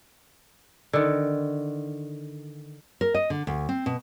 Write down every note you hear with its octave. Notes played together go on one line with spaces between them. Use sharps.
D3 D#3
A#4
D#5
D3
D2
C4
B2